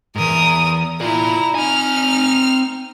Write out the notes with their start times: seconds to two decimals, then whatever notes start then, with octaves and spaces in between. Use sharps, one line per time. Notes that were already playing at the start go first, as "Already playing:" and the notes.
0.16 E2 G#2 A#4 D#6
1.01 E4 F4 D5 A#5
1.55 C4 D#4 G#5 F6